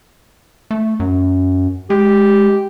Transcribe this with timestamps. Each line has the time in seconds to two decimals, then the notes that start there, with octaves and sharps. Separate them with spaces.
0.71 A3
1.00 F#2
1.90 G#3 G4